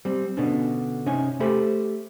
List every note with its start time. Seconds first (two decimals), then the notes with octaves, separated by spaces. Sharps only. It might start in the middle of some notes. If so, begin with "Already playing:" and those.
0.05 G3 C4
0.37 B2 D3 C#4 D4
1.06 C3 C#4 D#4 G#5
1.40 A3 G4 A4 C5 B5